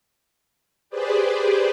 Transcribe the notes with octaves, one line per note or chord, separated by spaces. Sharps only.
G4 G#4 B4 C5 D5